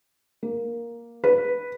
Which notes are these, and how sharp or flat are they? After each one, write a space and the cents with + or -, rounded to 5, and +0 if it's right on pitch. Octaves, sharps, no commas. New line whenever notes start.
A#3 +5
B4 -5